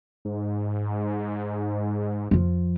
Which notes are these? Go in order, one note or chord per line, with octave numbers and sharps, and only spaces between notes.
G#2
F2 F3